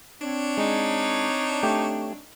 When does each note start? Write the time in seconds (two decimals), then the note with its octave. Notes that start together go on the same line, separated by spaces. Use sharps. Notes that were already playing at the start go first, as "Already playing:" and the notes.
0.22 C4 D4 C#5
0.57 G#3 D#4
1.63 A3 G4